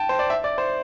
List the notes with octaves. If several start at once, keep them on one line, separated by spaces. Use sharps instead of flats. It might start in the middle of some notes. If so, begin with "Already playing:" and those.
Already playing: G5 A5
C5
D5
E5
D5
C5